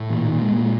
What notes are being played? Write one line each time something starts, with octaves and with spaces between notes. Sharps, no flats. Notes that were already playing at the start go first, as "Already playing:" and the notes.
Already playing: A2
A#2 E3
D#3
A#2
G#3
A#2
G#3